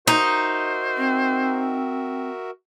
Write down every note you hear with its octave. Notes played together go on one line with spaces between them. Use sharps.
D#4 F#4 A#4 C5 E5
C4